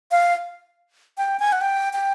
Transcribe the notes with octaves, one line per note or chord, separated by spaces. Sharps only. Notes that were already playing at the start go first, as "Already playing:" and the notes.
F5
G5
G#5
F#5
G5
G5